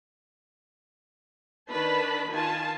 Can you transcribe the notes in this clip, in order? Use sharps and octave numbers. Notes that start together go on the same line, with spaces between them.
D#3 D4 B4 A5 B5
D#3 F4 G#5 A5